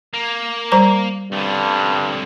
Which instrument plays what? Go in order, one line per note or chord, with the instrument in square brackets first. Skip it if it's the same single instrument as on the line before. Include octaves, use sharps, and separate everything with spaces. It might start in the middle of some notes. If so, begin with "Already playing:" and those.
[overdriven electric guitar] A#3
[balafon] G3 C5 A#5
[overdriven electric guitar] C2 D3 [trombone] G2